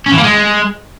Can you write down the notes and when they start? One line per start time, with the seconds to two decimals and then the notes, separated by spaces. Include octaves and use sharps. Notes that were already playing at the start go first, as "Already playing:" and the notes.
0.06 C#4
0.12 E3
0.18 A#3
0.23 G#3